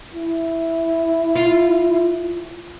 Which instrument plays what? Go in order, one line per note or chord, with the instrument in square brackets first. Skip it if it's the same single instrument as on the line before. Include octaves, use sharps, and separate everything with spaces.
[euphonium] E4
[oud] F4